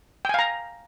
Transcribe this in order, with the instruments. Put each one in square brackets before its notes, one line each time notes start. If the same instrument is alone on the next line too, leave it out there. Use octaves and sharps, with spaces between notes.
[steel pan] G5
G#5
F5
A#5